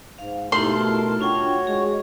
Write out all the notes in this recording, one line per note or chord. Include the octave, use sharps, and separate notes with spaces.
G#2 F5
B2 A3 D#4 E4 G4 A#4 A5 C6
D4 F4 F#4 C#5 G5
G#3 G#4